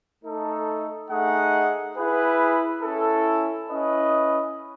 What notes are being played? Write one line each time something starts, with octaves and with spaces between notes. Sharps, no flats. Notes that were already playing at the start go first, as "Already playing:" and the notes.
A3 D#4 A4
A3 D#4 G#4 D#5 F#5
E4 G#4 B4
C#4 E4 A4
C#4 E4 B4 D#5